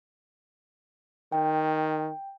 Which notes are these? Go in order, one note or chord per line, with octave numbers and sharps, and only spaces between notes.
D#3 G5